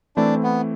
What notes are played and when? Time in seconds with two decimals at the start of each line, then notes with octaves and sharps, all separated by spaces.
0.16 E3 A3 C4 D4 E4
0.43 B3